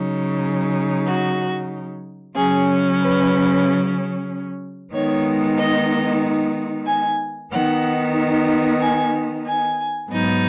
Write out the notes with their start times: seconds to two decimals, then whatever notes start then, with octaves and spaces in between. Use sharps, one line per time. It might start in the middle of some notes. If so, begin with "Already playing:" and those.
Already playing: C#3 F#3 D#4
1.06 F#4
2.35 C#3 F#3 C#4 G#4
2.99 B4
4.93 D#3 G#3 B3 D#4 C#5
5.58 D#5
6.86 G#5
7.51 D#3 B3 D#4 F#5
8.80 G#5
9.45 G#5
10.10 G#2 F#3 B3 D#4